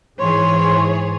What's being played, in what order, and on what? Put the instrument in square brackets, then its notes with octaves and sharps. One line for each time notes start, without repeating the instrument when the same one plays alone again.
[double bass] G#2 [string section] E3 G#4 [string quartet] C#5 [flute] C6